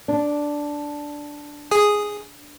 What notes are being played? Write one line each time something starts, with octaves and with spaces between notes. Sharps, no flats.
D4
G#4 G#5 D#6